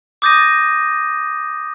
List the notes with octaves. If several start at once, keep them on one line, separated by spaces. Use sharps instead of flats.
D6 D#6 G6 A6 A#6 D#7